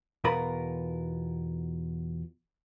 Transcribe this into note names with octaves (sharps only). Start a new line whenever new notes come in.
E2 B2 B3 F4 A#4 B5